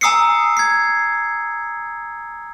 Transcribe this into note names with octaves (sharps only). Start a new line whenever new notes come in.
G#5 A#5 D#6 E6 C7 C#7
G#6 C7